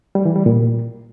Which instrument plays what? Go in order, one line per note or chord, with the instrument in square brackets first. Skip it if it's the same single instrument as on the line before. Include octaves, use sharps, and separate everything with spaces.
[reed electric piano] G3
E3
G3
A#2